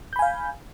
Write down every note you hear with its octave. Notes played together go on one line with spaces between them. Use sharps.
F5 G#5 B5 G6